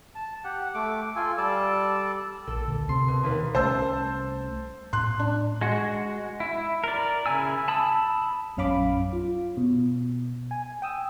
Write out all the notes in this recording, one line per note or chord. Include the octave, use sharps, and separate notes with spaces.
A5
G4 F#5
A3 D6
F4 A4 G#5
G3 A4 D5 A5
A#1 A4
D2
C3 C6
B2
D#2 A#3 B4
C2 A3 C#4 C5 A5 E6
A2 C6 F#6
D4
G#3 F#4
E4
A#4 D5
C#3 E4 G#5 E6
A5 B5 D#6 E6
A#1 F#2 C#4 F5 B5 D6
F4
B2
G#5
G5 D#6 E6